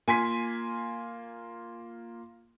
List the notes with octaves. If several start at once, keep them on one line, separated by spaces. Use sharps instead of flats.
A#3 F4 G#5 C6 B6